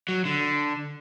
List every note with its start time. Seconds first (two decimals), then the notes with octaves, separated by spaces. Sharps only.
0.08 F#3
0.25 D3